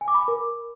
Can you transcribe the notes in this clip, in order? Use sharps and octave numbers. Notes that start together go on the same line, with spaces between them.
G#5
D6
B5
D6
A#4